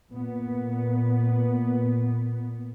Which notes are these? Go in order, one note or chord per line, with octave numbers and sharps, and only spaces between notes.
A#2 B3